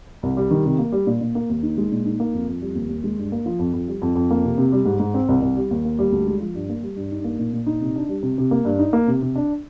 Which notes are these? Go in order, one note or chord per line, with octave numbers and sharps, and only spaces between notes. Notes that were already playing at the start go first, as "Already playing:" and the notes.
C2
G3
D#3
C3
A#3
G3
A#2
A#2
A#3
D#2
D#4
G#3
A#2
D#4
A#3
F2
F2
G3
D#2
D#2
G#3
G2
A#3
F3
F2
F2
G3
F2
F2
A#3
C3
C3
G3
G#2
G#2
C4
C2
C2
G3
D#2
A#3
G3
D2
G#3
F3
G2
A#3
G3
G2
D#4
A#3
A#2
A#2
D#4
C3
D4
G3
C3
C3
A#3
G2
D#4
A#3
C3
C3
D4